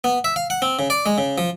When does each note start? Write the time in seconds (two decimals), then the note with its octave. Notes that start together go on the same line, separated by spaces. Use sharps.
0.04 B3
0.24 E5
0.36 F5
0.50 F#5
0.62 C4
0.79 C#3
0.90 D5
1.06 G#3
1.18 C#3
1.38 F3